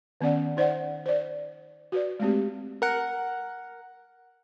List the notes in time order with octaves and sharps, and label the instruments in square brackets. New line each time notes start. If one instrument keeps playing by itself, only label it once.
[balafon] D#3 B3 C#4 D5 F#5
D#4 C5 D5 E5 F#5
C5 D5
F#4 B4 D5
G#3 A3 C4 G4
[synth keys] A#4 F#5